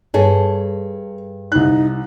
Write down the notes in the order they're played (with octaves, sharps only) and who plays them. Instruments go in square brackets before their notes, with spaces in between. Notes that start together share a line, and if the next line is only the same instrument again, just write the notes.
[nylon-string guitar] G2 G#4 A4 [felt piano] C#5
[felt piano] C2 F#6 [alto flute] D#4